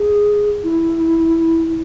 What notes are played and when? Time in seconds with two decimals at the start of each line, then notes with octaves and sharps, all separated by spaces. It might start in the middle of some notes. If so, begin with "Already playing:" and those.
Already playing: G#4
0.64 E4